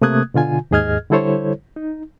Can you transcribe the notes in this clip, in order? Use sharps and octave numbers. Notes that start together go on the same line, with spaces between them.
C3 A3 A#3 D#6 F#6 G#6
B2 D3 F4 G#5
D#2 G#2 G#4 D#5 F6 G#6
D3 G3 E4 A4 C5 C#5
D#4